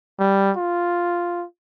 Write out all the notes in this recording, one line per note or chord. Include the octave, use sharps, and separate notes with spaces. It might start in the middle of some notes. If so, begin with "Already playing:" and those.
G3
F4